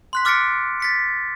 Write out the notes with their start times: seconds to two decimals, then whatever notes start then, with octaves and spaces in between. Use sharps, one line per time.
0.13 C6 F#6 B6
0.25 D6 F6 A6 B6 C#7 D7
0.80 A6 B6 C#7